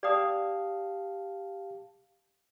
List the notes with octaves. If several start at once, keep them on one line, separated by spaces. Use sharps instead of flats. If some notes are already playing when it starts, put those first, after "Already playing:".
G4 D5 F5 A5 D#6